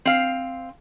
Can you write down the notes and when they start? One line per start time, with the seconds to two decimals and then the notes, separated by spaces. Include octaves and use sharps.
0.05 C4 F5